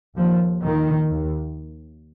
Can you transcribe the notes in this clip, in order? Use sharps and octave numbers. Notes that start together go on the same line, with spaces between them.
D#2 F3
D#2 D#3
D#2